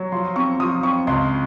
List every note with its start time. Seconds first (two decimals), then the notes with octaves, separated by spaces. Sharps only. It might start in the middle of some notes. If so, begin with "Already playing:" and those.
Already playing: F#3
0.12 F3 C6
0.36 C4 C#6
0.60 F3 D#6
0.83 C4 C#6
1.07 C#2 C6